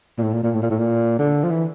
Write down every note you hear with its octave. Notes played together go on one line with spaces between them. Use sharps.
A#2
A2
A#2
A#2
A2
A#2
A2
A#2
D3
F3
E3